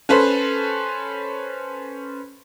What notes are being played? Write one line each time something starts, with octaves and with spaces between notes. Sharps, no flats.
C#4 A4 B4 C5